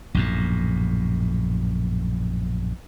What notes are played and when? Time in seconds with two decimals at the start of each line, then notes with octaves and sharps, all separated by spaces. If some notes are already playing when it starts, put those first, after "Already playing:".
0.15 A#1 F#2 A2